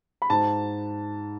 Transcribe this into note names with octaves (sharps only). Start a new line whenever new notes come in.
B5
G#2 A5